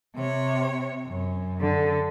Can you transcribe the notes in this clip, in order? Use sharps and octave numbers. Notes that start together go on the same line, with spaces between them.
C3 C#5
F#2
D3 A4